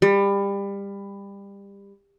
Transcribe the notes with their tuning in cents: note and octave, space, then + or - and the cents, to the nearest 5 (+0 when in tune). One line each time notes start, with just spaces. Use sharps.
G3 +25